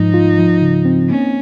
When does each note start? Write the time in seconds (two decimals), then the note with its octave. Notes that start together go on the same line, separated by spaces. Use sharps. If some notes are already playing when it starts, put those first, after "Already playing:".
Already playing: G#2 F3 D#4
0.14 F4
0.38 F3
0.62 C#3
0.85 C4
1.10 A#3 C#4